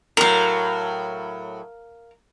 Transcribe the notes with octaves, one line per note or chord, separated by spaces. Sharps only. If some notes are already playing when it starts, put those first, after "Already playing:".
A2 F#3 A#4 F5